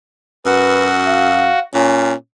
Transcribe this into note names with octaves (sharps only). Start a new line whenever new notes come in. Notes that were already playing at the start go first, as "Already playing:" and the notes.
F#2 F#4 B4
F5
A#2 C#4